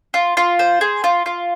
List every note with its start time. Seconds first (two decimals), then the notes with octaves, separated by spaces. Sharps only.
0.14 F4
0.37 F4
0.59 C5
0.81 G#4
1.04 F4
1.26 F4